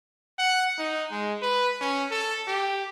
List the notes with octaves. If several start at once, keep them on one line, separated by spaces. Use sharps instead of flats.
F#5
D#4
G#3
B4
C#4
A4
G4